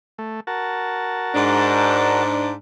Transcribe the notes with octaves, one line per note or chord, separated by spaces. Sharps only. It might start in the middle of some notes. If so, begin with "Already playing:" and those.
A3
F#4 A#4 A5
G#2 D4